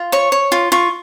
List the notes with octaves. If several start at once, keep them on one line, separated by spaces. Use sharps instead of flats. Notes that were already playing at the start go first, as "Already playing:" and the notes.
Already playing: F4
C#5 C#6
C#5
F4
F4 C#6